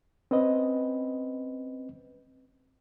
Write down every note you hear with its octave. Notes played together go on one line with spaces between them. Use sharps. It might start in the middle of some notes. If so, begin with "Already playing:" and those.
C4 C#4 B4 D#5